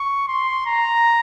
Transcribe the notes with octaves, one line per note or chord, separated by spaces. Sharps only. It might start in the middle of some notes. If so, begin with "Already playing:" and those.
Already playing: C#6
C6
A#5